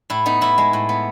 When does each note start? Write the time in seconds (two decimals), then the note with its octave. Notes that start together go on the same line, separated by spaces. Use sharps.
0.10 A2 E4
0.26 B3 D#4
0.41 A2 E4
0.58 G#3
0.73 A2
0.89 B3